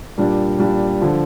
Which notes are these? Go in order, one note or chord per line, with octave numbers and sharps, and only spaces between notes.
A#2 G3 D4
A#2 G3 D4
D3 F3